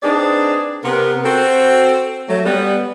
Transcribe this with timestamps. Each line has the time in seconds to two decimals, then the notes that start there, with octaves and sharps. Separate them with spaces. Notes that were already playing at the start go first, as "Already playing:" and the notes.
0.03 C4 D4 D#4 G#4 B4 D5
0.84 C3 B3 A#4
1.25 C4 F#4 A4
2.29 F#3 A3
2.45 G3 B3